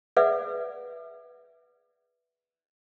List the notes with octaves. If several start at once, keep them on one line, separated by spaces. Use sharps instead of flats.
G#4 B4 D5 E5 F#5